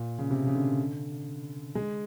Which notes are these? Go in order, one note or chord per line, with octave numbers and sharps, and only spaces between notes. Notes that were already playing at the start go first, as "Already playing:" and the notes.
Already playing: A#2
C#3
C3
C#3
D3
G#3